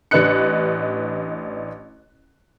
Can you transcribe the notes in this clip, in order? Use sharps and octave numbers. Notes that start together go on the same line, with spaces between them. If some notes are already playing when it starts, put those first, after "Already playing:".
A1 D4 B4 D#5 F#6 C#7